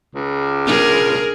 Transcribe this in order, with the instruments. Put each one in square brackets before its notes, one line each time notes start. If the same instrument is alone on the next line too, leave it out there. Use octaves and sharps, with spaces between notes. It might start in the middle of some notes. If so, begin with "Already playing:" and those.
[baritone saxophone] C#2
[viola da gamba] D4 G#4 A#4